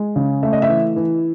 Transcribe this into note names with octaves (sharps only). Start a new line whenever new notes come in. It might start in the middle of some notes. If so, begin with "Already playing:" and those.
Already playing: G#3
C#3
A3 E5
D#5
E5
E3
E3